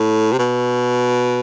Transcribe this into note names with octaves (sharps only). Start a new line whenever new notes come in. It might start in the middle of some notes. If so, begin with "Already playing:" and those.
Already playing: A2
C3
B2